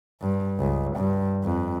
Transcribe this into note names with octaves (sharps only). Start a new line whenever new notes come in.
G2
C#2
G2
F2